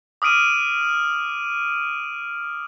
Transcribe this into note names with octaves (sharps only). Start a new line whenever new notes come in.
D6 D#6 F6 D7 D#7